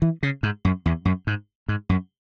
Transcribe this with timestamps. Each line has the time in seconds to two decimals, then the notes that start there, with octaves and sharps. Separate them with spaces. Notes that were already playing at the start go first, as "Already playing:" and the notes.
0.02 E3
0.23 C#3
0.43 G#2
0.65 F#2
0.86 E2
1.05 F#2
1.27 G#2
1.68 G#2
1.89 F#2